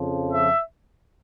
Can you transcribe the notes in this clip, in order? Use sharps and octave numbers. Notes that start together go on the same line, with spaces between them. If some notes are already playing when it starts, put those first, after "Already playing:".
Already playing: F2 C#3 F3
E5